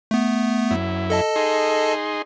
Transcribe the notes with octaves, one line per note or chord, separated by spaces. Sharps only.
A3 B3
F#2 E4
A4 D#5 A5
D#4 G#4 C6